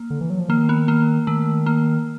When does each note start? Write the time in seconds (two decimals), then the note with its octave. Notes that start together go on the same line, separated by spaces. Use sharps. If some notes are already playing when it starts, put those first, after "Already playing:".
Already playing: A#3
0.10 D3
0.21 E3
0.30 F#3
0.40 F3
0.49 D#3 A#3
0.69 B3
0.88 A#3
1.27 D#3 A3
1.66 A#3